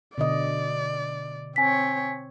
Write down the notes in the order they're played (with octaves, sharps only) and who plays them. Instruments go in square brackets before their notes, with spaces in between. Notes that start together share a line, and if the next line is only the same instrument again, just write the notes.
[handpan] B2 D3 D#5 [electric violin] D5
[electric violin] C4 C#5 [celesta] G#5 B6